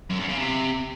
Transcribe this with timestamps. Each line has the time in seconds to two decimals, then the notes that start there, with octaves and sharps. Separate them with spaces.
0.10 F#2
0.19 E2
0.29 C#3
0.39 C3